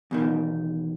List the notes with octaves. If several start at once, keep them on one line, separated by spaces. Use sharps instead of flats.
E2 B2 D#3